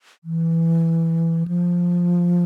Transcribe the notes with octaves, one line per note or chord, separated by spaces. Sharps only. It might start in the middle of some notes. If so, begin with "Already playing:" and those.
E3
F3